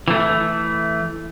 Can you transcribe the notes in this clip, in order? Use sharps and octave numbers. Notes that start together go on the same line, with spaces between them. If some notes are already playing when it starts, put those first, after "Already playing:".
E3 A3